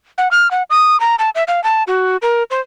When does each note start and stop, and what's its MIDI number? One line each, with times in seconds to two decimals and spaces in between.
0.18 0.28 78
0.31 0.50 89
0.51 0.63 78
0.70 0.99 87
1.00 1.15 82
1.19 1.30 81
1.35 1.43 76
1.48 1.63 77
1.64 1.83 81
1.87 2.17 66
2.22 2.43 70
2.51 2.60 72